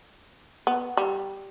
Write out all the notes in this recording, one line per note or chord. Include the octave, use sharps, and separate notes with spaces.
B3
G3